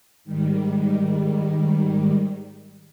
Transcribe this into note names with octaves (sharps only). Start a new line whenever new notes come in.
G#2 D#3 G3